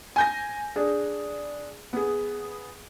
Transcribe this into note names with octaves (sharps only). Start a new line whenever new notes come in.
G#5 G6 A#6
D4 G#4
B3 G#4